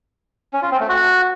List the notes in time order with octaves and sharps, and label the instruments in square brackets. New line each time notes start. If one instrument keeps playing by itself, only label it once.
[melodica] C#4
F4
C4
A3
F#4